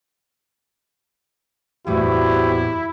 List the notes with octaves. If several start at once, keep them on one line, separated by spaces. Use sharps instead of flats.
E2 A2 C3 G3 E4 F#4 G4